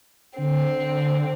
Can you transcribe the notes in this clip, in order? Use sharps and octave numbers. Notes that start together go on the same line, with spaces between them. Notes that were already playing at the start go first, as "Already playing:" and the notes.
D3 C4